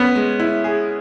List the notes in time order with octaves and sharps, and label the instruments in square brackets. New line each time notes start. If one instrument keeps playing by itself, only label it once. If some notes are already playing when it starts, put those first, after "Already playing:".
Already playing: [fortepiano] B3 [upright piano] C#4
[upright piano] G#3
E4
G#4